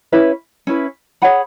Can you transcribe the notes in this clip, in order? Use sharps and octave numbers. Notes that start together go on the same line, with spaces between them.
C#4 E4 B4
C#4 E4 B4
G#4 C#5 F#5 B5